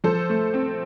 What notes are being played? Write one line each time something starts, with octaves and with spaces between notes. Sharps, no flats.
F3 A4 C5
A3
C4